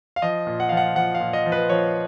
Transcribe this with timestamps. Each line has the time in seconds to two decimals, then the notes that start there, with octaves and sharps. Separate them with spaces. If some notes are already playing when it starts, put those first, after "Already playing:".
0.16 F5
0.22 F3 D#5
0.47 A#2
0.60 F#5
0.69 F3 F5
0.77 F#5
0.96 F3 F#5
1.14 F5
1.20 A#2
1.33 D#5
1.46 F3
1.52 B4
1.69 F3 C#5